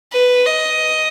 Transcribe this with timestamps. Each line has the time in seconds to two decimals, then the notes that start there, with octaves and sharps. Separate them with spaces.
0.12 B4
0.46 D#5